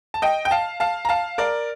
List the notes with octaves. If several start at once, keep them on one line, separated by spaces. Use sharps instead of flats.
A5
D#5 G5
G5
F5 A5
F5 A5
A#5
F5 A5
A#4 D5